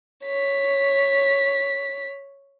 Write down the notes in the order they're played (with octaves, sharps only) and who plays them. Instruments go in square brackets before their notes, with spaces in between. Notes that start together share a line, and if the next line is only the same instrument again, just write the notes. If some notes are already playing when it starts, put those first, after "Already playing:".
[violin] C#5 B6